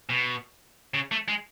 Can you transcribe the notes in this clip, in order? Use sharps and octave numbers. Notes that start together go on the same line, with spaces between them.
B2
C#3
A3
G#3